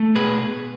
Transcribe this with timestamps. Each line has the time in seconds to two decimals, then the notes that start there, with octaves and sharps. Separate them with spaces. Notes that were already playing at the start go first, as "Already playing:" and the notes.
Already playing: A3
0.16 B2 G#4 B4